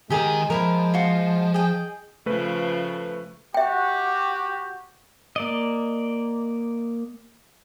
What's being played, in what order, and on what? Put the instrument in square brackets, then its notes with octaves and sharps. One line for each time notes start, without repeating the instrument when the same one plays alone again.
[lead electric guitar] D#3 A#5 [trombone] G#3 [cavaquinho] G4 G#4 A#4
[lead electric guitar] F3 [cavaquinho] E4 G4 A#4
[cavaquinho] F4 F#4
[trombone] G#4 [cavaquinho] D#5 G5
[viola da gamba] C#3 F3 F4 [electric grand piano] A3 B4
[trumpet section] F#4 G4 [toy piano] E5 G5
[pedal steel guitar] A#3 D5 D#5